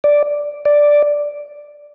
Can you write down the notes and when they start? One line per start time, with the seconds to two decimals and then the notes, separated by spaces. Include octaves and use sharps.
0.04 D5
0.65 D5